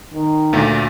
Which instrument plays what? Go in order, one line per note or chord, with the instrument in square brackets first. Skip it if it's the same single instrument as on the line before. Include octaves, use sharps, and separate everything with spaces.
[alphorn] D#3
[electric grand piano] D2 A#2 A3